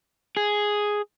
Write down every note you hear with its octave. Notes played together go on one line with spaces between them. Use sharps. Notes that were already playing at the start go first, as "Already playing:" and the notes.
G#4